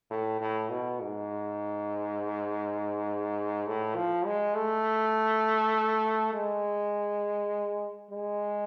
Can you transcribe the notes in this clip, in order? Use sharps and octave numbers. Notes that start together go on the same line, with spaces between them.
A2
A2
B2
G#2
A2
F3
G#3
A3
G#3
G#3